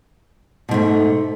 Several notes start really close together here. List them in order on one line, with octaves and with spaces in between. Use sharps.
B2 G#2 A3